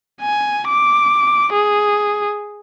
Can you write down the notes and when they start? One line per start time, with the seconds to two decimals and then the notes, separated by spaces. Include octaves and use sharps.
0.22 G#5
0.68 D6
1.53 G#4